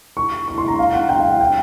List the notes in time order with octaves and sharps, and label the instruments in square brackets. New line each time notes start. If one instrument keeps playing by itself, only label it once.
[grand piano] C#6
C#6
C6
A#5
F5
F#5
G5
F5
F#5
G5